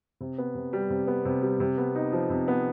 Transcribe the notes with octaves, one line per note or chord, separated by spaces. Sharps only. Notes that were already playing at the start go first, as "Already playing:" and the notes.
C3
B3
C3
G3
C3
B3
C3
G3
C3
B3
D#4
F3
C3
B3